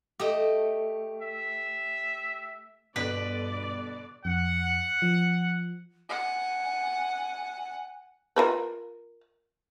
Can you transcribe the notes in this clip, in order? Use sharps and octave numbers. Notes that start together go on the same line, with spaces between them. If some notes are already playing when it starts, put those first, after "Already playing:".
A3 G4 D#5
E5
G2 B2 D3 B4 D5
F2 F#5
F3
F#5 G#5
F4 A#4 B4